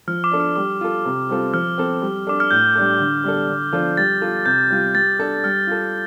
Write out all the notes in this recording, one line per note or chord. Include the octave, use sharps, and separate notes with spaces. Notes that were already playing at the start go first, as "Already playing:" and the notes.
F3 F6
D6
D4 A4
F6
G3 D6
F4 A4
C3
G3 C4 F4 A4
F3 F6
C4 A4
G3
D4 A4 D6
F6
A2 G6
G3 D4 A4
D3
G3 D4 A4
D3
F3 D4 F4 A4
G3 A6
F4 A4
C3 G6
G3 F4
G3 A6
D4 A4
G3 F6
F4 A4